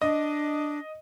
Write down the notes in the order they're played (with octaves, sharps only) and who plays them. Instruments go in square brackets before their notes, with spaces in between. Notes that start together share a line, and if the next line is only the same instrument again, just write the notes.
[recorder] D4 [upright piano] D#5